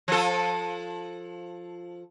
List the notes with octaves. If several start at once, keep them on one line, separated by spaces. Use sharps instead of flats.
F3 A4